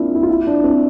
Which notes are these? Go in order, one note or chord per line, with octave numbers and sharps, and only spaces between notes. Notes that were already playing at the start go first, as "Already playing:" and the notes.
Already playing: A#3 C4 D4 E4 F4
E4
F4
E4
D4
C4